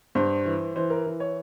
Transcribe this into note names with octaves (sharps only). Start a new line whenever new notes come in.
G2 C5
E3
E3 C5
A#4
E3
C#5